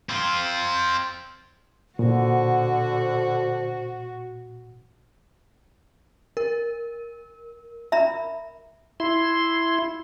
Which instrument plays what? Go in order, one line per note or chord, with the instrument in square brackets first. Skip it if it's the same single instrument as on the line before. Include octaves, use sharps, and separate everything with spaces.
[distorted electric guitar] C4 F4
[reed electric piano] A#2 [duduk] D3 [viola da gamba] F#4 [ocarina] C5
[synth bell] A#4
[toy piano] E5 A#5 B5
[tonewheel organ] E4 C6